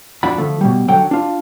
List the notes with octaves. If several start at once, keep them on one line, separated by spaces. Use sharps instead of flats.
F2 D4 F4 F#4 B5
D3 F3 A3
B2 G3
D3 F#3 C#5 F#5 G5
D4 F4